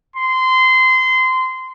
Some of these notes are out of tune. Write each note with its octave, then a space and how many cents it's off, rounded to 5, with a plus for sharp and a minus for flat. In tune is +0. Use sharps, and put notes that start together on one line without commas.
C6 -20